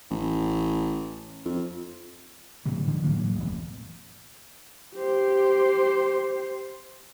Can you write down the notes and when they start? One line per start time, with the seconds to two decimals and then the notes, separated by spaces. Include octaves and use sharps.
0.11 A1
1.45 F2
2.65 A2 D3 F#3 A3
2.86 D2 D3 F3
3.04 A2 E3 F#3 A#3
3.36 E1 A1
4.95 G4 C5